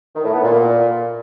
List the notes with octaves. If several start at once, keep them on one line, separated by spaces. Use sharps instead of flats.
D#3
A2
B3
A#2